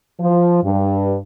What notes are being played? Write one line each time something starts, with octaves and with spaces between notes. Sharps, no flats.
F3
G2